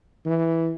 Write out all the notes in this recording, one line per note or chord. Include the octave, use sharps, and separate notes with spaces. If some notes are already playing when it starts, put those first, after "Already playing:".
E3